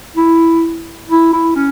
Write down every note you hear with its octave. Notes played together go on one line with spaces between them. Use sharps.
E4
E4
E4
C#4